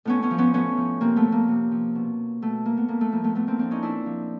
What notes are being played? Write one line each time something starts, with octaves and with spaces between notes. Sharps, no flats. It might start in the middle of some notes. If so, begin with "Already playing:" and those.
A2 B3 C#4
B3 C#4
F3
B3 C#4
A2 B3 C#4
F3
C3 A#3 C4
A3 B3
F3
A#3
C3
F3
B2
B2 A3
A#3
A3 B3
A2 A#3
A3
F3 A#3
A3 B3
A2 A3 B3
A#3 C4
F3 C4 D4
C#4 D#4
A#2 D4 E4
F3